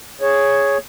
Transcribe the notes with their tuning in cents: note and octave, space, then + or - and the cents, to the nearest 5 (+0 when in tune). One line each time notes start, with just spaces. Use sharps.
G#4 +0 C#5 +0